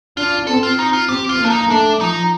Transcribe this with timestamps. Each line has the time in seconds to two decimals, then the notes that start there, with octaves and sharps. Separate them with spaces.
0.17 D4 F4
0.47 C4 A4
0.63 F4
0.79 D#4
0.93 F4
1.09 C4 G4
1.29 F4
1.39 A#3
1.45 D4
1.50 D#4
1.70 A3 D4
2.00 F3 D#4